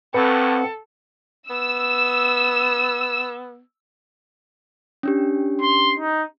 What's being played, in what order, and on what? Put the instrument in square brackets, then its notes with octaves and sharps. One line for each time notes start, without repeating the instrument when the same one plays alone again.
[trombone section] A#1 F2 A2 [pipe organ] C4 F#5 [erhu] A4 [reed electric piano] B4
[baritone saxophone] B3 [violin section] E6
[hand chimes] C#4 D4 G4
[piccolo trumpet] C6
D#4